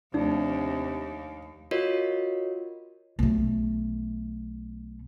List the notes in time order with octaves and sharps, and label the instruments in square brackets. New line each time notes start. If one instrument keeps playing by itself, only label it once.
[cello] D#2 [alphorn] C3 [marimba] F3 A3 A5 [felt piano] D4
[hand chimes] F4 F#4 A#4 C#5 D#5
[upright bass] B1 A3